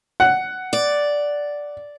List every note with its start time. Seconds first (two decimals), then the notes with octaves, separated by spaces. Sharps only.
0.20 F#5
0.73 D5